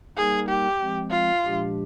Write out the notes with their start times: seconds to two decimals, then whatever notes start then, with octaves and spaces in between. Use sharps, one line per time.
0.17 G3 A#3 D#4 G#4 A#4
0.49 G4
0.80 F3 G#3 C4
1.11 F4
1.43 A#2 F3 G#3 D4 G4